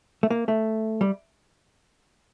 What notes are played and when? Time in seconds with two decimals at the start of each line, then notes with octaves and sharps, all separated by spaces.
0.23 A3
0.30 A#3
0.48 A3
1.01 G3